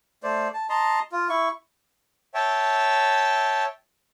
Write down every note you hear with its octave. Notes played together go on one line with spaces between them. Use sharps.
A3 C5 D5
A5
D#5 A5 A#5 C6
F4
E4 C#6
C#5 E5 G5 A5